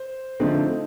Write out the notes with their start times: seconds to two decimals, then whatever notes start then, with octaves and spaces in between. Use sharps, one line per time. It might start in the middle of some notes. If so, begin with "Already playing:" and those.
Already playing: C5
0.40 D3 F3 A3 C4 D#4